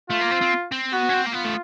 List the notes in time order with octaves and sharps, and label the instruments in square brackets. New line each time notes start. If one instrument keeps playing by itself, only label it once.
[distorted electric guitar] A3 [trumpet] F4
[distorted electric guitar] A#3
C4
C4
C4
[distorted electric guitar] B3 [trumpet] F#4
[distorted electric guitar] C#4
C4
A#3
[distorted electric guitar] B3 [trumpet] F4
[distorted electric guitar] A3